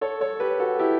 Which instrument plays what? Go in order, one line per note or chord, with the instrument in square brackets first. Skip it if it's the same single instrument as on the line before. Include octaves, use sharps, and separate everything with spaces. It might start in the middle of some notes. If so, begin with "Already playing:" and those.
[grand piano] A4 C#5
A4 C#5
G4 B4
F#4 A4
E4 G4